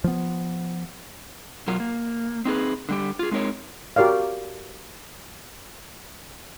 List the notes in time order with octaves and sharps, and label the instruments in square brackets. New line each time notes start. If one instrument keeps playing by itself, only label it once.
[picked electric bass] F3 B3
[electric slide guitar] B2 F#3 F4 A#4
A#3
C4 D#4 G#4 B4
D3 G3 G4
F4 G#4
G#3 A3 C4 D#4 A#4 C#5
[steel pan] F#4 G4 A#4 D5 F5